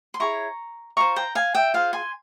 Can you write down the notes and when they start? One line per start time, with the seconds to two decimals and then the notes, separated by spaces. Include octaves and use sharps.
0.14 C6
0.20 E4 G#4 C#5 A#5 C#6
0.97 F4 C5 A#5 C#6
1.16 G5 A#5
1.35 F5 G#5
1.55 E5 G5
1.74 F4 G#4 C5 F5
1.93 G#5 C6